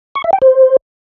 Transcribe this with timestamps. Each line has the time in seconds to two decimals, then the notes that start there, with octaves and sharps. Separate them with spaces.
0.15 C#6
0.24 E5
0.33 G5
0.42 C5